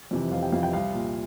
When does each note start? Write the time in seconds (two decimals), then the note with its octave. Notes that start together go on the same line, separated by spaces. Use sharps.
0.11 F2 C3 E3
0.31 F1 F5
0.42 G5
0.52 F2 C3 E3 F5
0.63 G5
0.73 C2 F5
0.94 A#2